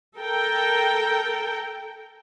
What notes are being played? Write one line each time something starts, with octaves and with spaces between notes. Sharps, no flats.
A4 A#4 G5